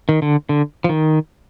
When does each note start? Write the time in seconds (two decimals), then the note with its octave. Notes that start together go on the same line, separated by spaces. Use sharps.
0.09 D#3
0.22 D3
0.49 D3
0.84 F3
0.89 D#3